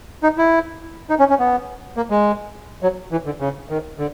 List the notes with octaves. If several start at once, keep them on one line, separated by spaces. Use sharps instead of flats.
D#4
E4
D#4
C#4
C#4
B3
A#3
G#3
F#3
E3
D3
C#3
D#3
D3